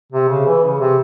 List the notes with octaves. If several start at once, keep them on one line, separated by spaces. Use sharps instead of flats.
C3
C#3
E3
C#3
C3